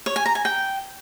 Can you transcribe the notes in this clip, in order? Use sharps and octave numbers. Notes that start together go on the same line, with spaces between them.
C#5
G#5
A#5
G#5
G5